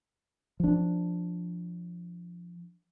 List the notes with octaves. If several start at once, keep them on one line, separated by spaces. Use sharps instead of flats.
F3 D4